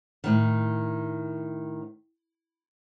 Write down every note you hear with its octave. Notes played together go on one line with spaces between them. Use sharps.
A2 D#3